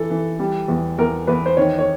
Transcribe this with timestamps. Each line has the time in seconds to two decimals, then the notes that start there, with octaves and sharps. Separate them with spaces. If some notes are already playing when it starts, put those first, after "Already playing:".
Already playing: E3 A4
0.10 E3
0.39 G3
0.68 E2
0.98 E2 A#4
1.27 E2 B4
1.46 C5
1.57 D#3 C#5
1.79 C#5